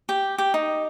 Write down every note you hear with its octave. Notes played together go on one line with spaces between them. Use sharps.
G4
G4
D#4